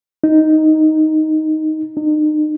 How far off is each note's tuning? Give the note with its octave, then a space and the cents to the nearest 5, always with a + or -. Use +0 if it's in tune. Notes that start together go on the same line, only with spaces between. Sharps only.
D#4 +5
D#4 -35